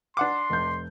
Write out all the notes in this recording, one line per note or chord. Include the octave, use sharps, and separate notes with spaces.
D4 F#5 C6 D6
F1 G6